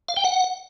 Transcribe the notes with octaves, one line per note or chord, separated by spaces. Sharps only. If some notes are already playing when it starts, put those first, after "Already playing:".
F5
G5
F#5